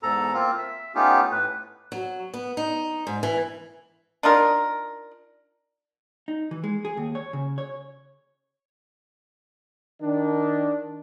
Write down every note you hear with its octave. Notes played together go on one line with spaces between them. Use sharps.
E2 G#2 A4 A#5
A#3 C4 F4
E5
A3 B3 C#4 D#4 F4 G4
A2 B4
F#3
B3
D#4
G#2
E3
D4 D#4 F4 A#4
D#4
E3
G#3
G#4
D#2
C#5
C#3
C#5
D#3 D4